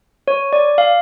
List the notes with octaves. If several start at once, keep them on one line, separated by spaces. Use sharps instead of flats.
C#5
D5
F5